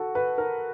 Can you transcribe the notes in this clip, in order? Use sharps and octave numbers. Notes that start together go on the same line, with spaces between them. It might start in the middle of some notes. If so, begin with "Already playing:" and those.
Already playing: F#4 A4
B4
A#4